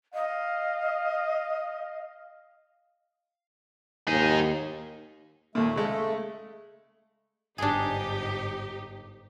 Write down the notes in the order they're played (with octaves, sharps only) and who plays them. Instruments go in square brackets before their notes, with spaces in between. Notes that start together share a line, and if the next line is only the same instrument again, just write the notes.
[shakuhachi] D#5 [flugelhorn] F5
[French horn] D#2 [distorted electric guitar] D#4 G#4
[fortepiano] D#2 A#2 [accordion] A3
[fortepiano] C#3 G#3 A4
[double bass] G1 G#2 [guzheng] D4 G#4 [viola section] D#4 G4